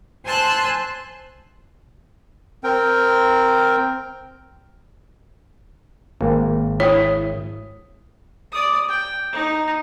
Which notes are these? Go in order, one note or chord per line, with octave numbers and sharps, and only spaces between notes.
C5 G#5 A5 C6 E6 F#6
C4 A#4 G5
G#1 A#3
E4 C#5 D#6
D5 D#6
G5
D#4